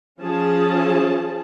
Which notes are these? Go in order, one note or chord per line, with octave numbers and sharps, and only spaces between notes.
F3 C#4 G#4 A5